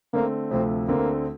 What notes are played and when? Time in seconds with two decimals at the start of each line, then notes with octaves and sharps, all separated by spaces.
0.13 D3 A3 A#3 C4
0.51 D2 C3 F3 A3 C4
0.88 D2 D3 A3 A#3 C4